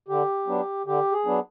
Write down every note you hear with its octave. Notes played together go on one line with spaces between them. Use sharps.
D3 G4
F#3 B3 D4
D3 G4
G#4
F#3 B3 D4